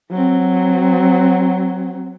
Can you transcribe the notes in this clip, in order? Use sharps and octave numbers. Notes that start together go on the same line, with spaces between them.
F#3 C4